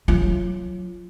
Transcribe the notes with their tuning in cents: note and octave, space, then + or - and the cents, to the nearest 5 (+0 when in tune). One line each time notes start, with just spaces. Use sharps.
F#3 -15 F4 -10